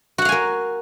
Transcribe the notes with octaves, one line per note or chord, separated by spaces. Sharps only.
F#4 A#4 F5 F#5 G#5